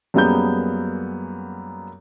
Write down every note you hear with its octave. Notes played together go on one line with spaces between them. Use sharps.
F#2 G3 A#3 B3 G#4 G6